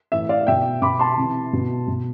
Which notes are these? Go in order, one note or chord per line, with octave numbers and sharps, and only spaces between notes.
A2 E3 E5
D5 F5
B2 E5 G5
B2 B5 D6
A5 C6
C3 E3
B2
B2